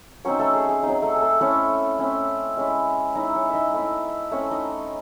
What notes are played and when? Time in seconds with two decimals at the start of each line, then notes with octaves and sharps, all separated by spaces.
0.25 F#3 C4 C#4 D#4 C#5
0.39 A3 A4
0.54 G#4
0.69 G#4
0.83 F#3 C4 D#4 G#4
1.02 A3 A4
1.15 G#4
1.22 A3 A4
1.40 A3 C4 C#4 E4 C#5
1.99 A3 C4 C#4 E4 C#5
2.57 G#3 C#4 E4
3.15 G#3 C#4 D#4 E4 D#5
3.35 C#4 C#5
3.50 D#4 D#5 E5
3.73 A3 C4 E4
4.31 A3 C4 C#4 E4 C#5
4.51 D#4 D#5